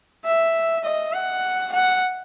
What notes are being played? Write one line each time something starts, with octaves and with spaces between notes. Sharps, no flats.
E5
D#5
F#5
F#5